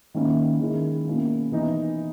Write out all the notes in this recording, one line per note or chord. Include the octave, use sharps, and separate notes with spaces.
D#3 A#3 C#4 E4
D#3 G#3 C#4 E4
B2 A#3 C#4 E4
E3 B3 D#4